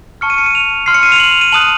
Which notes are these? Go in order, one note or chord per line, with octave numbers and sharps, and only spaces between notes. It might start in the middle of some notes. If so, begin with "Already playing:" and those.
A5 C#6 F6 C#7
D#7
C#7
D#7
F7
C6 F6 C7
C#7
D#7
F7
F#7
F7
D#7
A5 D#6 F#6 F#7